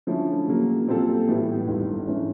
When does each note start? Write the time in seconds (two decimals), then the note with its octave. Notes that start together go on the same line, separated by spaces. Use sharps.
0.07 D3 F3 A3 C#4 E4
0.48 C#3 F#3 A#3
0.87 A#2 G3 C4 F4 A4
1.28 A2 E3 G3 B3
1.68 G1 G2 D#3
2.07 G#2 E3 A3 C#4